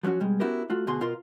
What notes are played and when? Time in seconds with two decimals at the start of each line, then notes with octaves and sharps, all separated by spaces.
0.03 F3 F#3 B3 C#4 F#4
0.20 B2 G3 G#3
0.40 B3 C#4 E4 F#4 G4 A#4
0.70 A3 F4 F#4
0.87 D2 B2 F#4 G#4 C6
1.01 B2 F4 A#4 C6